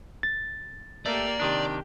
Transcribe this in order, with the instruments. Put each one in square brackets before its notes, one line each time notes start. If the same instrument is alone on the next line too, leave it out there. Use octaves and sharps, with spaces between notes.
[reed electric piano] A6
[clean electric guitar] A3 [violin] A#3 G4 [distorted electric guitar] D5
[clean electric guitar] C3 D#3 D4 [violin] G4